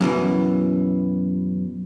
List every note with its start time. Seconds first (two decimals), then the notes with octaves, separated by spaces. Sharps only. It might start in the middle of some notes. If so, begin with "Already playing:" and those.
0.01 F#2 B2 D#3 E3